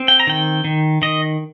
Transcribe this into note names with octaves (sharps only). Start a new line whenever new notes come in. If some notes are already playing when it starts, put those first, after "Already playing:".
Already playing: C4
G5
A#5
D#3 G5
D#3
D#3 D#5